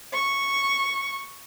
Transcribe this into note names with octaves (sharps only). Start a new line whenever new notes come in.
C#6